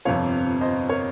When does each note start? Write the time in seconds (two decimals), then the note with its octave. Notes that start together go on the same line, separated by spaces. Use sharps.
0.05 G1 F2 C3 F3 C#5 F5
0.61 C5 D#5
0.89 A#4 C#5